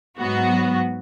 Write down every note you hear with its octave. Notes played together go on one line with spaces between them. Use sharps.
G#2 F#3 B3 F#4